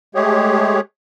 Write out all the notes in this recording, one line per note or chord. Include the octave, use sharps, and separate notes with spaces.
G#3 A3 G4 G#4 C#5